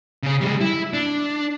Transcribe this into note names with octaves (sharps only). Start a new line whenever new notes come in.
C#3 C#4
G3 G#3
E4
D4